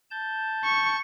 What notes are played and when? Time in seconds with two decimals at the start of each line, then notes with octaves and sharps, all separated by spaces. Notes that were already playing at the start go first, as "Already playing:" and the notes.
0.10 A5 G6
0.65 C#6